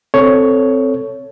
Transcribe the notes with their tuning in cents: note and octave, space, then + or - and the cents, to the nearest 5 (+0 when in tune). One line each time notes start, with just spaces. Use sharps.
C4 +0 A4 +0 C#5 +10